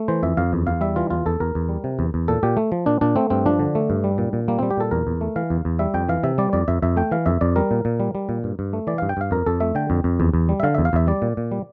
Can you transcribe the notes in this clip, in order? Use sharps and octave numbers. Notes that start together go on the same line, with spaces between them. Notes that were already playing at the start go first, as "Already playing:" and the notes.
Already playing: A3
E3 C5
F2 E5
F2 F5
E2
E2 F5
G3 E5
E3 F4
E2 F4
E2 A4
E2 A#4
E2
G3
C3
E2
E2
A#2 A4
A#2 G4
A3
F3
A#2 D4
A#2 D4
A3 C4
G2 C4
F3 D4
D3
A3
G2
G3
A#2
A#2
G3 A#3
G3 C4
G4
A#2 A4
E2 A#4
E2
A3
E3 F5
E2
E2
G3 E5
F2 G5
E3 F5
C3 E5
G3 D5
F2 D5
F2 E5
F2 E5
A3 G5
E3 F5
F2 E5
F2 D5
G3 A#4
A#2
A#2
G3
G3
A#2
G2
G2
A3
E3 D5
G2 F5
G5
G2 F5
F2 A#4
F2 A4
A3 E5
D3 G5
F2
F2
E2
E2
G3
E5
D3 F5
E2 E5
F5
E2 E5
G3 D5
A#2
A#2
G3